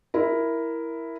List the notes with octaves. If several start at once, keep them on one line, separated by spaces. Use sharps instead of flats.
E4 A#4